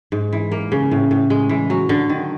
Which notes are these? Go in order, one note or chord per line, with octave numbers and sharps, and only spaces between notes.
G#2
E3
A#3
C#3
A2
A2
G#3
E3
F#3
D3
D#3